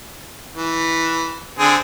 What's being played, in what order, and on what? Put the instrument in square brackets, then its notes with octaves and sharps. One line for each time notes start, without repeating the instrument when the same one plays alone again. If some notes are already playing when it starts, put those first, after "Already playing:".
[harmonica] E3
D3 C4 G#4